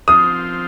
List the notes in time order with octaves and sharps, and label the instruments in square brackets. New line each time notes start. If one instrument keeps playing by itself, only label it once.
[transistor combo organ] F3 C4 F4 [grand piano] D#6